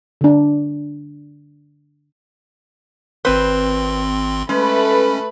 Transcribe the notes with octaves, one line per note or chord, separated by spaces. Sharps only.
D3 D4
G#1 C4 B4 C5 C6
G#3 A3 C#4 B4 B5